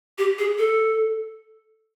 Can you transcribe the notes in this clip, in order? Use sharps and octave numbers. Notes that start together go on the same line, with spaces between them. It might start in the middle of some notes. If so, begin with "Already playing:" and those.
G4
G#4
A4